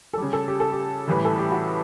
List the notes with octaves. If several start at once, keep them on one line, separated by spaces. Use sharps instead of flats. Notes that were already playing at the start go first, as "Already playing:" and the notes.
A4
C#3 G3 G4
A4
G4
A4
G4
A2 E3 G3 B4
A4
G4
F#4